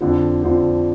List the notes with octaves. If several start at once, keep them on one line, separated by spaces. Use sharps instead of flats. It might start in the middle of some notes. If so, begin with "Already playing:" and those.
F2 D3 F3
F2 D3 F3